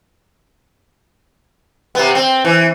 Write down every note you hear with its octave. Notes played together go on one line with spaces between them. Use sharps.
C3 B3
C4
E3